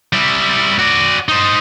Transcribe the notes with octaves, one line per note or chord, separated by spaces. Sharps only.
G3 E4
F#4 D5
D#4 C5